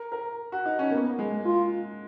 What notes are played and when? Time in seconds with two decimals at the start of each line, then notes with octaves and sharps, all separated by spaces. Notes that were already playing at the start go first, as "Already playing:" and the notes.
Already playing: A#4
0.12 A#4
0.52 F#4
0.65 D#4
0.79 C#4
0.91 A#3 B3
1.19 G#3
1.45 F4